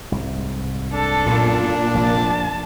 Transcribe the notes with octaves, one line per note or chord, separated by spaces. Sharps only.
C2 G#2
D4 A4
B1 F#2 A#2
F1 A#1 C3 A5